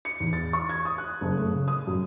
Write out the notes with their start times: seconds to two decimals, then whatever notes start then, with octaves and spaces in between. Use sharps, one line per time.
0.05 C#7
0.20 E2
0.33 A6
0.53 C#6
0.69 G#6
0.85 D#6
0.98 F#6
1.21 F#1
1.36 A3
1.51 C#3
1.68 D#6
1.87 F#2